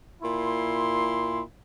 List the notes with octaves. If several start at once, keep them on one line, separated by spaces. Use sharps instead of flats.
A#2 E4 C6